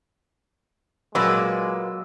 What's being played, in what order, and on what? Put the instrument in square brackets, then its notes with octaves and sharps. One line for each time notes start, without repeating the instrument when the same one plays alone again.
[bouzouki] A#2 A#3 B4 [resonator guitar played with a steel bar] F#3 [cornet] G#3 [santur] E6